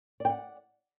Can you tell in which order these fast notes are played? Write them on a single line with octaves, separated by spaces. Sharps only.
D5 G5 F#5